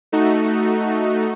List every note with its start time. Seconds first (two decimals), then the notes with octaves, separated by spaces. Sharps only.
0.12 A3 D#4 F#4